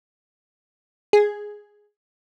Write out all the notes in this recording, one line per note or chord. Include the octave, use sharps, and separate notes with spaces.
G#4